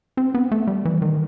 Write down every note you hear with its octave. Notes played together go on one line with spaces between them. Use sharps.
C4
B3
A3
G3
E3
D#3